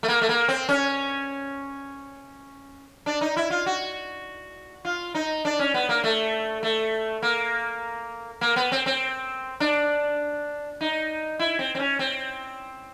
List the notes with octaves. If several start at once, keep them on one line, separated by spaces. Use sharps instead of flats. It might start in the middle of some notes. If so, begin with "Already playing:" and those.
A3
A#3
A3
A#3
C4
C#4
D4
D#4
E4
F4
F#4
F4
D#4
D4
C#4
B3
A#3
A3
A3
A#3
A#3
B3
C4
C4
D4
D#4
E4
C4
C4
C#4
C4